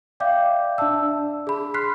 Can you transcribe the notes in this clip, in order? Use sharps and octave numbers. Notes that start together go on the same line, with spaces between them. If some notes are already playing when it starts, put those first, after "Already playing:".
D5 E5 F5 G5 D6 G6
D4 D5 E5 A5 E6
G#4 B5
B5 C6 F6 F#6 B6 C7